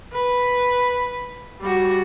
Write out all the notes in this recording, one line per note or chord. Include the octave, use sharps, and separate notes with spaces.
B4
G3 F#4